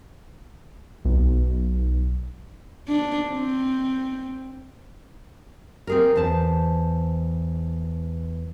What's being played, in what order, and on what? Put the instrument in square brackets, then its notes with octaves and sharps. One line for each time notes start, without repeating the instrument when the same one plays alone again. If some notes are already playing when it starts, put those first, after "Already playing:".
[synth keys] B1
[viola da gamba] D4
C4
[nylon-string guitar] C4 G#4 A#4
E2 C5 A5